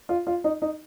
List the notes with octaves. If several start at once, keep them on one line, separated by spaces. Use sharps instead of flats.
F4
F4
D#4
D#4